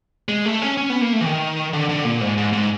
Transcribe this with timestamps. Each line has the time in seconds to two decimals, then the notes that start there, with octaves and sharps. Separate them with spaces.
0.29 G#3
0.45 A3
0.62 C#4
0.77 C#4
0.90 B3
1.01 A#3
1.13 A3
1.21 E3
1.26 D#3
1.73 D3
1.89 D3
2.04 A#2
2.21 G#2
2.38 G#2
2.53 G#2